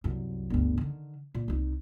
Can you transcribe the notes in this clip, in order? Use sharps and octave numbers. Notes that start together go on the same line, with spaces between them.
C2 F#2
G1 D2
D3 D#3
A#2
C2 D#4